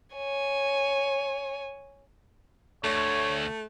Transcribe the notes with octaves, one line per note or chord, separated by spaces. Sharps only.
C#5 G#5
D2 A3 C#5